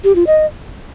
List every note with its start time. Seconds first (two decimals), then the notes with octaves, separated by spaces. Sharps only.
0.04 G4
0.15 F4
0.27 D#5